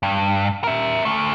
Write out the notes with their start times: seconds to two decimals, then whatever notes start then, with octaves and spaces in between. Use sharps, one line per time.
0.03 G2
0.64 A#4 E5
1.05 D2 A3